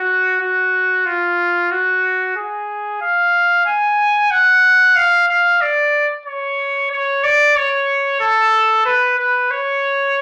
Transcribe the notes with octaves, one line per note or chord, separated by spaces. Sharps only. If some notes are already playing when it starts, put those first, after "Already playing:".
Already playing: F#4
F#4
F4
F#4
G#4
F5
G#5
F#5
F5
F5
D5
C#5
C#5
D5
C#5
A4
B4
B4
C#5